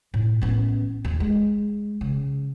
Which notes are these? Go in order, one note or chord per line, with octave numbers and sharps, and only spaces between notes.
A2
A1 B3
D#2
G#3
C#3